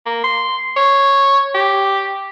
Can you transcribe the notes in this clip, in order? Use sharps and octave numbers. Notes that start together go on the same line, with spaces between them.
A#3
C6
C#5
G4